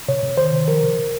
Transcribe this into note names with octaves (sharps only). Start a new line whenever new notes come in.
C3 C#5
C3
D#3 C5
D#3
F3 A#4
C3
C3